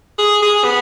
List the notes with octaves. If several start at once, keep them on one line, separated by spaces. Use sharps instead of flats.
G#4
G#4
B3